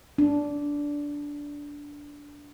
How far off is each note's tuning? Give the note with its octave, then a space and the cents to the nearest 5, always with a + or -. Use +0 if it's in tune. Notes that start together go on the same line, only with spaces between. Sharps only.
D4 -15